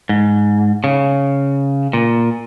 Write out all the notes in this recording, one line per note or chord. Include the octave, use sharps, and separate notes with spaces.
G#2
C#3
A#2